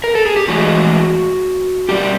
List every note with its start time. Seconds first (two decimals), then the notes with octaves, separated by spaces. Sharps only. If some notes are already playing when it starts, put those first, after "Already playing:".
0.04 A#4
0.15 A4
0.26 G#4
0.37 G4
0.48 A2 E3 G#3 F#4
1.89 B2 G3 G4